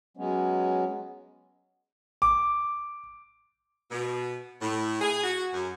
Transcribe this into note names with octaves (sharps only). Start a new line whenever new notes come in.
F#3 G#3 B3 C#4
D6
B2
A2
G#4
F#4
F#2